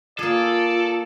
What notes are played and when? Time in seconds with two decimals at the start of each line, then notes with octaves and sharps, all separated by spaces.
0.19 A#3 F4 G#4 A4 D5